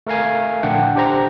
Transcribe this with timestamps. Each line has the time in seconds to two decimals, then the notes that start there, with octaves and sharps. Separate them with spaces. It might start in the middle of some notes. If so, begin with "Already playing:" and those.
0.07 A3 A#4 F5 G#5
0.63 A#1 D3 D4 F#5 G5
0.95 D4 G4 C5 A#5